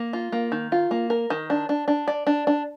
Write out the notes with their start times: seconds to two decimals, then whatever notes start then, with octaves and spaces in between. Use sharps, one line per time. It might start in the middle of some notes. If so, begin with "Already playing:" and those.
Already playing: A#3
0.13 F4
0.32 A#3
0.52 D#3
0.72 F4
0.91 A#3
1.10 A#4
1.30 D#3
1.50 D4
1.69 D4
1.88 D4
2.08 D5
2.27 D4
2.47 D4